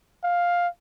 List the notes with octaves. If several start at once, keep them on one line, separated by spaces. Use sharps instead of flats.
F5